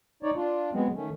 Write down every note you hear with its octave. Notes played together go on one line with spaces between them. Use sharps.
D#4 C#5 D5
D4 F4
F#3 G#3 B3 C4
D#3 A3 C#4